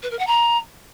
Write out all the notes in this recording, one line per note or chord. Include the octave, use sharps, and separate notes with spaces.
B4
A#4
F#5
A#5